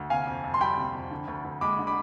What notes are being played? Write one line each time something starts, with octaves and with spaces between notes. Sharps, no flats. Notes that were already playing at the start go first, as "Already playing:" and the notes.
Already playing: D2
C3 F5 G#5
F2
F2
C6
G3 G5 B5
C3
F2
D3
D2
D2
G#3 B5 D6
D3
B5 D6